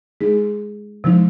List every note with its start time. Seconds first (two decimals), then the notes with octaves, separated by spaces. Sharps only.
0.21 G#3 D#4 G#4
1.04 C3 F3 G#3 D#4